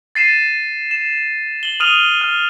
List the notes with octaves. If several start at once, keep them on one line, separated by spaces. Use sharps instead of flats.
A6 C7 D#7 E7
E7
F#7 G7
D#6 F6 D#7 F7 G7
F6